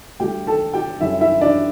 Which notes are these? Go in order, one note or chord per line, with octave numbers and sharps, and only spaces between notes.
D2 D3 G3 G4 G5
A4 A5
G4 G5
F#2 D3 G3 E4 E5
E4 E5
D4 D5